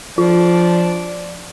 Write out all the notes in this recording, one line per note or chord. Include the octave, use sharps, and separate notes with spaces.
F3 D4 F4